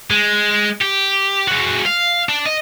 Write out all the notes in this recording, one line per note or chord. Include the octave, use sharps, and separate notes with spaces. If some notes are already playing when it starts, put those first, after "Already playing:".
G#3
G4
G#3 F#4
F5
D4
D#5